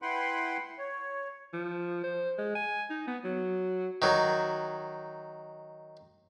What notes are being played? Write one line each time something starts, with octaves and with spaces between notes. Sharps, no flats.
E4 B4 F#5 G5 B5 C6
C#5
F3
C5
G#3
G#5
D#4
B3
F#3
D#3 F#3